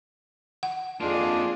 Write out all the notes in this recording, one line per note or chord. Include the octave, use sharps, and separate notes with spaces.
F#5
F2 A#3 D4 D#4 F4 G#4